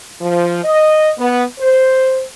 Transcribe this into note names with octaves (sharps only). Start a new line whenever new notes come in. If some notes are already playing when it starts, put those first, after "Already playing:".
F3
D#5
B3
C5